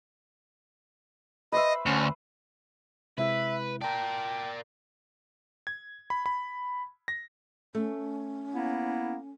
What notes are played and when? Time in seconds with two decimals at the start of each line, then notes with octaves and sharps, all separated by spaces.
1.52 B4 C5 D#5 E5
1.86 D2 C#4
3.18 C3 G#3 E4 B4 E5
3.82 A#4 D5 G5 A5 A#5
5.67 G#6
6.10 B5
6.26 B5
7.08 A#6
7.75 A3 C#4
8.54 A#3 B3 E4